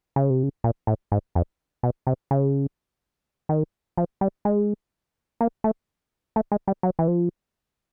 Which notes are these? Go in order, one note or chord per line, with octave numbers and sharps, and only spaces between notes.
C#3
C3
C#3
A#2
A2
G#2
F2
B2
C3
C#3
D#3
F3
G3
G#3
A#3
A3
A3
G#3
G3
F#3
E3
F3